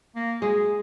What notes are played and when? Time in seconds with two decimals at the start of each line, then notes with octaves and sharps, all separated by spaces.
0.16 A#3
0.42 G#3 G#4